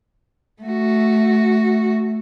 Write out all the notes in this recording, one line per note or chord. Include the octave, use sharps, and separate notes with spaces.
A3 F#4